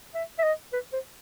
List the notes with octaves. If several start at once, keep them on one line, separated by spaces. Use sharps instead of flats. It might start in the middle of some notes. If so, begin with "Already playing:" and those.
E5
E5
D#5
B4
C5